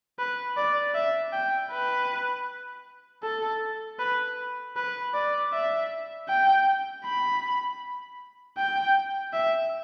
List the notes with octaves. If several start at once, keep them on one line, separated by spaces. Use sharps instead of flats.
B4
D5
E5
G5
B4
A4
B4
B4
D5
E5
G5
B5
G5
E5